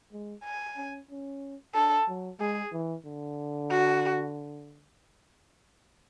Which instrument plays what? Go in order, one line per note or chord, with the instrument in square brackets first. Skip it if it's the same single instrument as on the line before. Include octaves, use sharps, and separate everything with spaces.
[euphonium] G#3
[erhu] G#5
[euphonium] C#4
C#4
[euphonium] D4 [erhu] A4
[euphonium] F#3
[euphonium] G#3 [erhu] G#4
[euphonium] E3
D3
[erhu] F#4